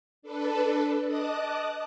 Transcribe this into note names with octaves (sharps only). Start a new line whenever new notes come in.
D4 A4 B4
D#5 A5 D6 D#6 F#6